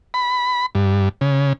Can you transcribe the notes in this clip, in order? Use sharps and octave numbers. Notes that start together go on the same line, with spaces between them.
B5
G2
C#3